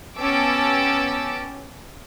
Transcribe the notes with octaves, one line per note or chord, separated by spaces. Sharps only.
B3 C#4 G4 A5 D6 E6